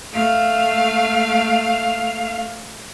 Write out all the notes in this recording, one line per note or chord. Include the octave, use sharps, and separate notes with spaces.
A3 F5